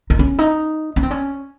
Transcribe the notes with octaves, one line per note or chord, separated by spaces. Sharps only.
D#4
C#4
D#4
C#4
C4
C#4